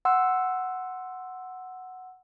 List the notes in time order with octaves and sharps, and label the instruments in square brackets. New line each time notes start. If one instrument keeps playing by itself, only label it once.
[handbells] F#5 C6 E6